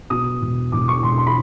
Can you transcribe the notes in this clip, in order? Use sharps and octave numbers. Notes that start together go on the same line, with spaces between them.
B2 D#6
E1
E1 D6
C#6
E1 C6
C6
B5